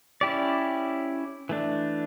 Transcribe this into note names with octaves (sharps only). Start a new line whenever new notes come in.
C#4 E4 G4 D5
E3 A3 D4